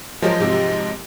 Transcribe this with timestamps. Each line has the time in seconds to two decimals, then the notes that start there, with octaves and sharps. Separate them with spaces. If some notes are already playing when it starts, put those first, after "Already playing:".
0.22 F3 F#3 G#3 C#4 G4 A#4 D#5
0.40 G#2 C3 F#3 G4